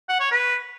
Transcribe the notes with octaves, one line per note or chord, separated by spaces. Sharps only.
F#5
C#5
B4